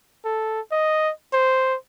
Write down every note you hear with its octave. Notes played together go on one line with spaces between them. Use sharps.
A4
D#5
C5